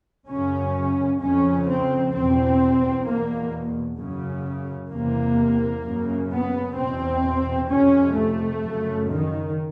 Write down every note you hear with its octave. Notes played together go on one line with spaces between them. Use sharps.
F#2 C#3 C#4
F2 C#3 C#4
C4
E2 B2 C4
E2 B2 A#3
F#2 C#3
E2 C3 A#3
F#2 C#3
B3
E2 B2 C4
F2 C3 C#4
A3
F#2 C#3
D#3